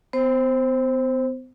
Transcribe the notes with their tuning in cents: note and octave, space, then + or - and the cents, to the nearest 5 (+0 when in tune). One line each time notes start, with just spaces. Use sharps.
B3 +45 C5 +5